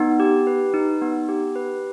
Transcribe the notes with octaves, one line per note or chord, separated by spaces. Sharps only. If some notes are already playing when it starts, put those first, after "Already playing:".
Already playing: B3 D#4
G4
B4
D#4
B3
G4
B4